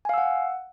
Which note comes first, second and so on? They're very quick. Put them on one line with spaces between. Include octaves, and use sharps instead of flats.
G#5 F5 E6 F#5